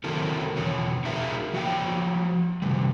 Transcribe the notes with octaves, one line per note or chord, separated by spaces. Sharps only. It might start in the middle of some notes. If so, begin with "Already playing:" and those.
D#3 F#3 C4 E4 A4 A#4
E2 B2 C#5
D#4 F#4 G#4 A#4 E5 F5
F3 F#4 C#5 G5
C3 D#3 G3